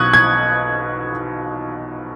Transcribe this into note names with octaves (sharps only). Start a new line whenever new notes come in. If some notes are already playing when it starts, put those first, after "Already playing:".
Already playing: B1 B2 C#6 D#6 F#6 G#6
G#6